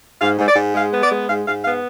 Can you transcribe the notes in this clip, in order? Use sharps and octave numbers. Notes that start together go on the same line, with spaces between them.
G#2 F5
G#2
D5
G#2
G#3 F5
B3
D5
G#3
G#2 F5
G#2 F5
B3 F5